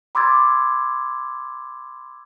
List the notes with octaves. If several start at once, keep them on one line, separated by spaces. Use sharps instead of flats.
B5 C6 D6 E6 G#6 A6